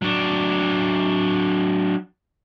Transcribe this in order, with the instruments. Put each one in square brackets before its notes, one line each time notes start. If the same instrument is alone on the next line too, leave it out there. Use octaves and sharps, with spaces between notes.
[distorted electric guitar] F#3 D4